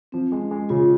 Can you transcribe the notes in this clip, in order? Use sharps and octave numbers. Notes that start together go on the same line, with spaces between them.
F3 C4
G#3
C#4
G#3
C#3 F4